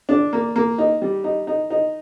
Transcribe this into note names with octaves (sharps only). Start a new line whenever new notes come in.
D4
A#3
A#3
D#4
G3
D#4
D#4
D#4